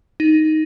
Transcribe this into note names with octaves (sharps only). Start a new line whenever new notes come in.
D#4